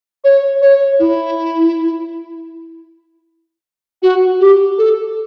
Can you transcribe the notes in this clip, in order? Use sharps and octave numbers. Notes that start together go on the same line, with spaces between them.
C#5
C#5
E4
F#4
G4
A4